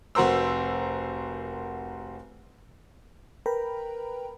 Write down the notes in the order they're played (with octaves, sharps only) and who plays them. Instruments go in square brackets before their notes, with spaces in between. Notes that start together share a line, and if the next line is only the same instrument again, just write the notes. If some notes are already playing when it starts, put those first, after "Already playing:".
[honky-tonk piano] F1 F#4 A#4 C5 E6
[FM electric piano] A#4 B4 G5 A#5 B5